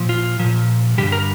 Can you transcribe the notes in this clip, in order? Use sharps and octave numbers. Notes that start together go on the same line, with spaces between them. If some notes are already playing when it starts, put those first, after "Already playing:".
Already playing: A#2 F3
F4
A#2 F3
G2 D3 G3 G4
A#4